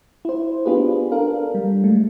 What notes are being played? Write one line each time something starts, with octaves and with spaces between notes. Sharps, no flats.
E4 C5
B3 D4 F4 G4 G#4 B4
D4 A4 A#4 F5
G3
G#3 A3